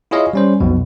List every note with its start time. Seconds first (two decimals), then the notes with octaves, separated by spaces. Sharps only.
0.11 E4 F4 G#4 C#5 D#5 F5
0.33 G3 C#4 C5
0.60 B1 F2 B2